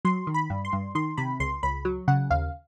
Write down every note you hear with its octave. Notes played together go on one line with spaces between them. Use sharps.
F#3 C6
D#3
B5
G2
C6
G2
D#3 C6
C3 B5
C#2 C6
C#2 B5
F#3
C#3 F#5
D#2 F5